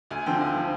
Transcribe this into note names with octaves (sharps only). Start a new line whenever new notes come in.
D2 G#5
D3 F3 C4 G5
D2
D3 F3 C4